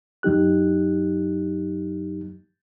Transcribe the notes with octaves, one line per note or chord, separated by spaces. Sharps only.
F#2 F#3 D#4 G4 F#6